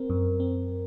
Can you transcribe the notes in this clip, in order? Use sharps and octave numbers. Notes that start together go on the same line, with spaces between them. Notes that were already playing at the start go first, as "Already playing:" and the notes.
Already playing: C4 A#4
F#2
C4